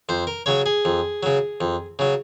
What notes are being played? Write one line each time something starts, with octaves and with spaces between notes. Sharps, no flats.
F2 C5
A#4
C#3 F#3 C#5
G#4
F2
C#3 F#3
F2
C#3 F#3